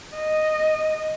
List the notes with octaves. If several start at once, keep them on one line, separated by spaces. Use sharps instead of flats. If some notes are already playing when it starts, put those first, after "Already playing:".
D#5